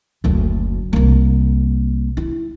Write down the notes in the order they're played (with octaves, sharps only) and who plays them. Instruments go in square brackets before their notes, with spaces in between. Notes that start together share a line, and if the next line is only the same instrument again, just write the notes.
[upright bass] F#1 D2
C2 A#3
E4